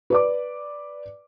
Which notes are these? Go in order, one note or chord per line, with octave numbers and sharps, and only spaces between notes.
B4 D5 D6